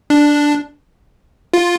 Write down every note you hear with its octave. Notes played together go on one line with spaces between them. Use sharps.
D4
F4